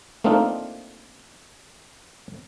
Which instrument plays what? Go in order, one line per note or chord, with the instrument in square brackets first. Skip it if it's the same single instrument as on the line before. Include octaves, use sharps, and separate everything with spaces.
[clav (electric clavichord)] A3 A#3 C4 D4 D#4 F4